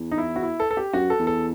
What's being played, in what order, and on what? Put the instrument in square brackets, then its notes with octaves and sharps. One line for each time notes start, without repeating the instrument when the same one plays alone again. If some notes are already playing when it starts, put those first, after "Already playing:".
Already playing: [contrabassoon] E2
[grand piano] D#4
E4
F#4
E4
A4
A4
G4
[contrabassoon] F#2 [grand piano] F#4
[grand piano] A4
[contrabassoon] E2
[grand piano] A4